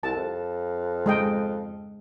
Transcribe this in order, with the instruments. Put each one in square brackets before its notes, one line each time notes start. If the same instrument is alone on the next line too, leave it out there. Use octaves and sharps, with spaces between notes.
[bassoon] C2 [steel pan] A5
[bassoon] F2
[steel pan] G#3 D#5 G5